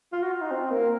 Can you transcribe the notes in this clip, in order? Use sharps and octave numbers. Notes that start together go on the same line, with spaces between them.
F4
F#4
F4
D#4
C4
A#3